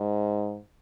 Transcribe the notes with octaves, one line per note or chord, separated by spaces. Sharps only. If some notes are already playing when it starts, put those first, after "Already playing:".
Already playing: G#2